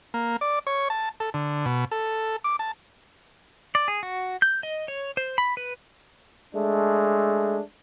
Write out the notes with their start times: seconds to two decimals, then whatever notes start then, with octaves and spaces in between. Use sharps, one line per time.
0.14 A#3
0.41 D5
0.67 C#5
0.90 A5
1.20 A4
1.34 D3
1.66 B2
1.91 A4
2.44 D6
2.59 A5
3.75 D5
3.88 G#4
4.03 F#4
4.42 G6
4.63 D#5
4.88 C#5
5.17 C5
5.38 B5
5.57 B4
6.53 G#3 A3 D4